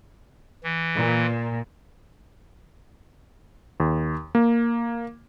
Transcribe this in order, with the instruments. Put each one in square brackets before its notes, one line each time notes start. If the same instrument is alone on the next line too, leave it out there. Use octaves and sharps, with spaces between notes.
[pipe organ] E3
[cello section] A#2
[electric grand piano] D#2
A#3